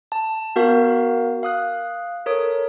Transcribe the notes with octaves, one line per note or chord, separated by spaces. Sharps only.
A5
B3 F#4 A#4 F5
F5 D#6 F#6
A4 A#4 C#5 D#6